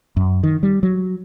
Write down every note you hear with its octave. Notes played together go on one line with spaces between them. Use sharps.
F#2
D#3
G3
F#3